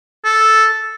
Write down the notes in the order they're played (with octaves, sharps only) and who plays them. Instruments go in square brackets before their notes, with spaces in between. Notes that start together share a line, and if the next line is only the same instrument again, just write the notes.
[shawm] A4